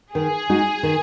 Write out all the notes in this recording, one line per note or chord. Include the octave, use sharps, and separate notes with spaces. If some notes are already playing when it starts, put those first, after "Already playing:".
D#3 G#4
G#3 D#4 F#4
D#3